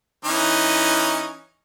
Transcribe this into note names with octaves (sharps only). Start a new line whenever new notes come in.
E3 C#4 D#4